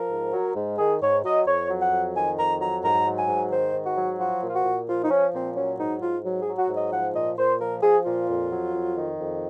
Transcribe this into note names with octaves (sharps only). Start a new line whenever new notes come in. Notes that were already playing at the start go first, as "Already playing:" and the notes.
Already playing: F3 A#4
G#2
F#3
G#2
D#3 G#4
G#2 C#5
F#3 D#5
F2 C#5
F#3
F#5
F2
D#3 G#5
F2 A#5
F#3 A#5
G#2 A#5
F#3
G#5
G#2
D#3 C5
G#2
F#4
F#3
F3 F#4
A#2
F4
F#4
A#2
F3 F4
D#4
F3 C#4
A#2 C4
F#3 C#4
G#2 D#4
G#2 F4
F#3
G#4
F#3
F#4
G#2
D#5
F3 F#5
A#2 D#5
A#2 C5
F3 A#4
F3 G#4
A#2 F4
F2
F#3
F2
D#3
F2